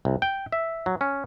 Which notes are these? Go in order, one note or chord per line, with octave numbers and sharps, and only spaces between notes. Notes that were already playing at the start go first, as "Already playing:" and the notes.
C2
G5
E5
F#3
C#4